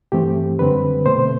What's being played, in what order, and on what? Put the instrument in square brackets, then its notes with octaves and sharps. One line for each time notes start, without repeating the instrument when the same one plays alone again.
[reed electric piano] G2 E3 A3 C4 G4
F#2 D3 G3 C4 B4
B2 A3 C4 C5